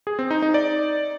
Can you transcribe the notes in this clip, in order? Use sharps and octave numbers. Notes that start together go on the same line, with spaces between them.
G#4
C4
D#4
D#4
D5